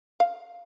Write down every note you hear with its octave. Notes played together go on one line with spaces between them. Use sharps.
F5